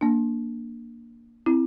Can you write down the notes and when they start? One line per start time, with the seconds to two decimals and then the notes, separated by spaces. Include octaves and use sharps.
0.01 A#3 D4
1.46 C4 E4